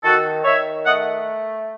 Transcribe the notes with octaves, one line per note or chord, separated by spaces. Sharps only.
D#3 F#4 A4
D#3 C#5 E5
A3 D#5 F#5